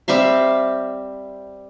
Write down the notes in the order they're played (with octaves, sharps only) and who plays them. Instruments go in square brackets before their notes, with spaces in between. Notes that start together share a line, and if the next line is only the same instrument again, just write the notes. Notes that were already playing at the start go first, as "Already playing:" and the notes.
[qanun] G3 C4 E5 F5